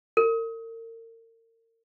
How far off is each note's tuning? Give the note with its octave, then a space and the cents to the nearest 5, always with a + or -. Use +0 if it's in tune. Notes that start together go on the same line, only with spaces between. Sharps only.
A#4 -40